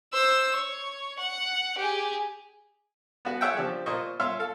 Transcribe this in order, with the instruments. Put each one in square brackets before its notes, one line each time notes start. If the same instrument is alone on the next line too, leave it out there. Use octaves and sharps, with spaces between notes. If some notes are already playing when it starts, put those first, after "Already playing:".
[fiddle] C5 E6
C#5
F#5
G4 G#4
[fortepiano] B3 F#4
F4 G#4 C#5 E5 F#5 G5
F3 D4 G4
A#2 F4 C5 D#5 C#6
F4 C#5 E5 F5 C6 F6
A4 F5